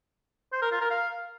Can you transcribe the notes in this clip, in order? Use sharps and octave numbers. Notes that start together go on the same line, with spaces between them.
C5
A#4
F4
A#4
F5